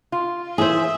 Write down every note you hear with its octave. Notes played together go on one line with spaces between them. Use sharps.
F4
E3 G#4 C5 E5